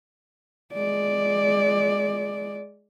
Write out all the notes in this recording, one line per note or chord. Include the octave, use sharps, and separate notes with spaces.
G#3 D5